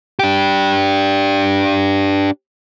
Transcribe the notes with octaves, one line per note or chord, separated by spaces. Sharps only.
D4 G4